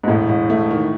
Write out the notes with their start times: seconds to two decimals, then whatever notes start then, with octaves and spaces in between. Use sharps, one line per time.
0.04 G#2
0.08 E1 A2
0.29 E1
0.50 A3
0.71 D#3